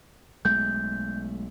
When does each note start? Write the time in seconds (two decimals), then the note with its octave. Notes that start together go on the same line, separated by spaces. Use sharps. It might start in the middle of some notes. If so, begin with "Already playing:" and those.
0.45 B1 G#3 A3 G6